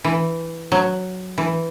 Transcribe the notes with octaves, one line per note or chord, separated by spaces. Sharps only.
E3
F#3
E3